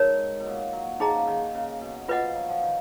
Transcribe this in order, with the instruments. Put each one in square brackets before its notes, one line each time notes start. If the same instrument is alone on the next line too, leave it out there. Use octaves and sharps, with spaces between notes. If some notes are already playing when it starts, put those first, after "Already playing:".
Already playing: [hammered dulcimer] G#2 [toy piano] D#4 A#4 C#5
[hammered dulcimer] B2
A#2
F#3
[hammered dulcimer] F3 [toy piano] D#4 G#4 D#5 A#5
[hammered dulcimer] C#3
D#3
C#3
B2
[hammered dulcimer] B2 [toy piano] F4 B4 D#5 F#5
[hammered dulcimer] F3
F#3
F3
D#3